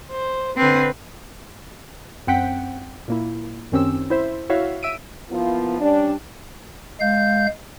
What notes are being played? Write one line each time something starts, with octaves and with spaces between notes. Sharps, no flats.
C5
D3 C4 B4
F#2 C4 F#5 G5 B6
A#2 A#3 E4
F#2 D#3 C4 C#4 G4 E6
E4 C5 E5
E4 F#4 C#5 E5 F5
E5 E6 D7 D#7
F3 A#3 B3 E4 F4
G3 C#4 D4
G#3 F5 G6